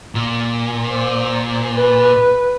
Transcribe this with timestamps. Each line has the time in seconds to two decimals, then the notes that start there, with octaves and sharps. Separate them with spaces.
0.15 A#2
0.90 C5
1.74 B4